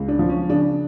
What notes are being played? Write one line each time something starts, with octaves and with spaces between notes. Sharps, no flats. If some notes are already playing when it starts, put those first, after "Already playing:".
Already playing: C#2
D4
F3
C#4
C#3 D4